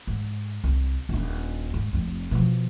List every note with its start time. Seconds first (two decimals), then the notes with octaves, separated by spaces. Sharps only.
0.07 G#2
0.64 C2
1.09 D#1 D4
1.74 G#2
1.93 F1 F2
2.31 B2 F3